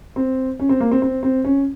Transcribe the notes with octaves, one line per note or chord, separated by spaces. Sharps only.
C4
C#4
C4
A#3
C4
C4
C4
C#4